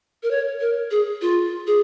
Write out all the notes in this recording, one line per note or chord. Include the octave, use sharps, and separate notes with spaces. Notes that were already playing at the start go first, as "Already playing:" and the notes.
A#4
C#5
A#4
G#4
F4
G#4